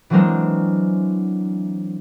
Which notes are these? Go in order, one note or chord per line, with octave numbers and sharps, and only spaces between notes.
E3 F#3 G#3 C4 D4 A#4